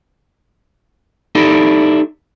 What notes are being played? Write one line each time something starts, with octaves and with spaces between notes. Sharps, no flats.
D#4 E4 G4 A4 D5